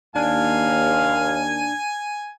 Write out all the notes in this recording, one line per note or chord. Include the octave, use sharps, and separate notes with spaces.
D#2 D4 F5 G#5